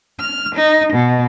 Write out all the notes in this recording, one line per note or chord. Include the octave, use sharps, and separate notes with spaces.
F6
D#4
B2